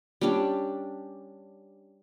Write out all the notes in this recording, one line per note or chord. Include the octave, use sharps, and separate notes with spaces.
G3 C#4 D4 G4